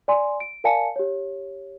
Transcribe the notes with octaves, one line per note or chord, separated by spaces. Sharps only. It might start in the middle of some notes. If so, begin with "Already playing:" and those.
D5 G#5 C6
D7
A#4 D5 F5 G#5 A5 C#7
G4 C#5